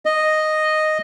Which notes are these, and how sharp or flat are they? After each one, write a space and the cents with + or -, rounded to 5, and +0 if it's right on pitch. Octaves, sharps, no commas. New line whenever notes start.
D#5 -5